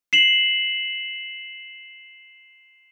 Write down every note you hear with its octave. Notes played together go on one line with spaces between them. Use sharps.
C7 E7 F#7